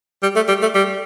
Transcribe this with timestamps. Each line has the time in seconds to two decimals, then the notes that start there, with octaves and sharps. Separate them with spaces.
0.23 G3
0.36 A3
0.48 G3
0.62 A3
0.75 G3